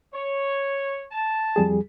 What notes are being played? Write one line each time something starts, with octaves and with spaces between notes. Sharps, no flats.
C#5
A5
F2 G3 G#4